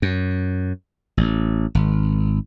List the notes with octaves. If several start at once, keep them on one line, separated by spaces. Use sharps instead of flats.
F#2
A1
G#1